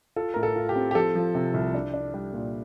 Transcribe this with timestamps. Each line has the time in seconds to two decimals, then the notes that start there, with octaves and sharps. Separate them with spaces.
0.16 F4 A4
0.34 A2 A#4
0.43 A4
0.56 F4
0.69 G4
0.76 C4
0.91 G4
0.95 F3 A4
1.15 F3
1.35 C3
1.54 C2
1.74 D4
1.94 D4
2.14 G3
2.33 A#2